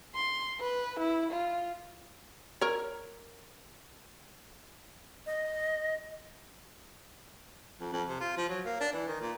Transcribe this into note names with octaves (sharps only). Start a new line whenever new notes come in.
C6
B4
E4
F4
A#4 C#5
D#5
F2
F2
C3
F4
F3
F#3
A#3
D4
E3
D#3
A#2